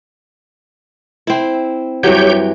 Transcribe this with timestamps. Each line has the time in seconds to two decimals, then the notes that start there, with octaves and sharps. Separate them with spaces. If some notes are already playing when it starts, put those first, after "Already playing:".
1.27 C4 E4
2.03 G2 E3 F#3 G4 C#5 G6